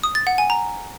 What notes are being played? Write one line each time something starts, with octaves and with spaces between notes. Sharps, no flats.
D#6
A6
F#5
G#5
A#5